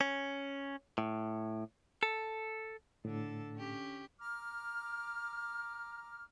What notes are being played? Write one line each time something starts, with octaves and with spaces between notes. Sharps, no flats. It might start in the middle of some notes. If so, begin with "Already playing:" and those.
C#4
A2
A4
A2 D3 A4
C#4 G4
A#5 D6 F6